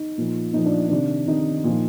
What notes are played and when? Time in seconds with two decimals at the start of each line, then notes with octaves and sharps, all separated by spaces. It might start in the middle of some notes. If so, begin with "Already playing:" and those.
Already playing: D#4
0.18 A#2 F3
0.53 A#2 F3 D#4
0.66 D4
0.89 C3 D#3 D4
1.27 C3 D#3 D#4
1.64 A#2 F3